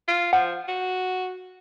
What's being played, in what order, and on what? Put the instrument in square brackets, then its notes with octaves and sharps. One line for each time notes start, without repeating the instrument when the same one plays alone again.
[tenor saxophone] F4
[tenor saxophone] F3 [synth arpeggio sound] F#5
[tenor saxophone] F#4